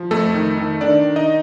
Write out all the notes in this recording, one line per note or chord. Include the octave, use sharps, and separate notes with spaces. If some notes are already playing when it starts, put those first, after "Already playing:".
Already playing: F3
F2 A3 A4
D#3
D#3
D#3 D4 D5
D#3
D#4 D#5